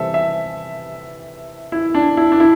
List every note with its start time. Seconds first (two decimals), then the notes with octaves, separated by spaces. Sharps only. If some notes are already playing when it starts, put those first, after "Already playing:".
Already playing: C3 E3 G3 C4 A4 E5
0.14 E5
1.72 E4
1.94 D4
2.17 E4
2.32 D4
2.40 E4